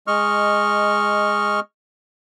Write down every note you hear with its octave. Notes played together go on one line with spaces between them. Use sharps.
G#3 D#5 C#6 F6